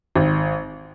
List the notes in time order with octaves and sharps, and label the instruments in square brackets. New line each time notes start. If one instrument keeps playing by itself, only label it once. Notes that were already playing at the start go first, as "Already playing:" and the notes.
[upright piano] G#1